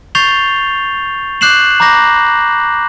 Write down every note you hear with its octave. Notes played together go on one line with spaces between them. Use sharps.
C#6 G6 A6 C7 F7 G7
D6 F#6 G6 C7 E7 F#7
A#5 B5 D6 G6 A#6